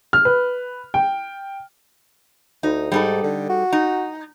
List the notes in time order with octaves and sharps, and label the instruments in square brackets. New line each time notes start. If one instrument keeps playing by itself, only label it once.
[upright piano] F6
B4
G5
[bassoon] D2 [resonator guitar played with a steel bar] D#4
[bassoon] G#2 [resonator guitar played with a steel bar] G3 D#4 A4
[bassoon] D3
F#4
[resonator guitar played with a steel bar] D#4